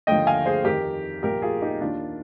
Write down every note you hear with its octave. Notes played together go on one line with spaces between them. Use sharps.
D#2 D3 F3 D#5 G5
F5 G#5
G#4 C5
F2 D#3 G4 A#4
C2 A#2 F3 G4 A#4
F4 G#4
D#4 G4
D#2 D#3 D4 F4